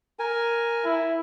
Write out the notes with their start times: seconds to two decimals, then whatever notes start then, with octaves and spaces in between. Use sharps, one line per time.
0.19 A#4 G#5
0.85 E4